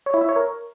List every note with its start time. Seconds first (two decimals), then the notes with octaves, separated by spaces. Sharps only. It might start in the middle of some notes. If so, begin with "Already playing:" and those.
0.06 C#5
0.14 E4
0.21 E5
0.29 C#5
0.36 A#4